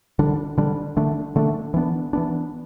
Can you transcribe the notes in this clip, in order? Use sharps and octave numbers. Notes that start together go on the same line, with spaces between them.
D3 G3 D4
D3 G3 D4
D3 A3 D4
D3 A3 D4
E3 B3 D4
E3 B3 D4